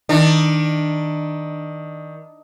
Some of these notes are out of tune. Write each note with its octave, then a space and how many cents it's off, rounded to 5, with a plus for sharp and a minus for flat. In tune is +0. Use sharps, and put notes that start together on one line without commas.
D#3 +20 D4 +25